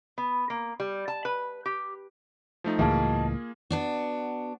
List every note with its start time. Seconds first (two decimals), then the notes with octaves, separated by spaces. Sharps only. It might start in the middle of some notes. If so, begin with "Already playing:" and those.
0.18 B3
0.50 A#3
0.80 G3
1.08 A5
1.25 B4
1.66 G4
2.64 F3 A3 D#4
2.79 C#2 A2 E3 A#3 F4 G#4 D#5 A5
3.71 B3 D4 F#4